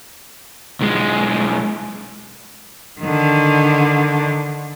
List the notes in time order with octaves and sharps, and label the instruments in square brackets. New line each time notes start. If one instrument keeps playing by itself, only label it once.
[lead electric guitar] B1 G#3
[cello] D3 D#3